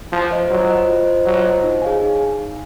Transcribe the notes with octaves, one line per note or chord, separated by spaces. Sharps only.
F3 F4
C5 D#5
F#3 F4
C5 D#5
F4
C5 D#5
F#3 F4
C5 D#5
D#4
G#4 C#5 F5 G#5
D#4